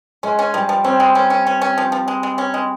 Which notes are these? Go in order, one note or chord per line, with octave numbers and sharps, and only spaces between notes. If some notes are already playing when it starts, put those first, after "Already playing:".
G#3 C#4
C#4
F3 G3
F3
C4 C#4
G#3
C#4
C#4
C#4
C#4
F3
F3
G#3
G#3
C#4
G#3